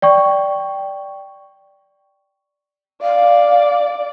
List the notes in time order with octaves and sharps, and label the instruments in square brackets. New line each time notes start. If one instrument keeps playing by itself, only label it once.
[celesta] D5 G5 C#6
[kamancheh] D5 [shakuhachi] F5